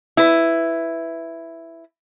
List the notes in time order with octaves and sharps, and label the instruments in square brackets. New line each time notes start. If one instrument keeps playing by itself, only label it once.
[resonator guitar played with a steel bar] E4 B4